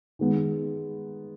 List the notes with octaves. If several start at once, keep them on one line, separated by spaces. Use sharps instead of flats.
D#3 G#3 B3